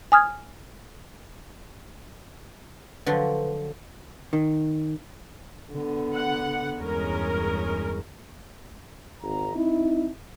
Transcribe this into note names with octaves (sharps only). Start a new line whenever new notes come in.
G#5 D#6 F6 G#6
D3 F3 F#3 B4
D#3
D3 B3
F#5
E2 G2 G#3 C#4 A#4
G#1 A#5
C4 D#4 E4